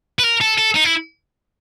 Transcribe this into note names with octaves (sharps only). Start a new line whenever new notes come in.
B4
A#4
A4
A4
D#4
E4